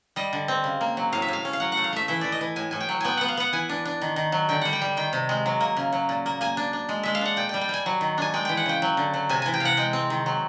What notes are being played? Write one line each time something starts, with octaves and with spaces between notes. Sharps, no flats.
G3 D#5
D3
C4
C#3
A#3
F#3
A2 F5
E5
A2 F5
C#4
F5
F#3 F#5
F#5
A3
F5
A3 E5
E3 E5
E3 D5
D#5
E3
A2 G#5
A2 G#5
G5
F#3
B3 G5 G#5
B3 F#5
F5
B3 F#5
E3 G#5
D4
D4
D#3
D#3
F#3
D3 G5
G3 F#5
G5
G3
D#3 G5
C3
G#3
F#3
A#3
C#3
F#3
A#2
A#3
A#3 G#5
D4
D4
G#3
G#3 E5
F5
D4 F#5
A#2 G5
G3 G5
G5
G3 G#5
F#3
D#3
D4 G#5
G#3 G5
E3 G5
F#5
C#3 G5
F#3
D3
F#3
C3 G#5
E3 G#5
G5
C3 F5 F#5
G#3 G5
C4
D#3
F#3